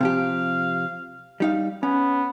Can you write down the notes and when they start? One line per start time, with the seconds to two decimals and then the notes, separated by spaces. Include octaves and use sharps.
0.01 C3 F3 G4 F5
1.40 G3 D#4 F5
1.83 B3 C#4